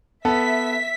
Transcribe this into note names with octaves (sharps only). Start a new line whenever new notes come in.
B3 A4 E5 B6